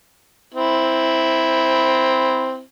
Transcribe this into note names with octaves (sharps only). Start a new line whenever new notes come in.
C4 E4